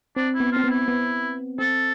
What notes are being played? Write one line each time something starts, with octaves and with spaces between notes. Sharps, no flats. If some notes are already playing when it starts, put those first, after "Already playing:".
C4 D4
E4
B3
C4 F4
B3
E4
B3
C4 A4